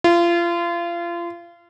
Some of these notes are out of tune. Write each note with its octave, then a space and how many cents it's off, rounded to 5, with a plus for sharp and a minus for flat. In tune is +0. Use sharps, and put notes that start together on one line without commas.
F4 -30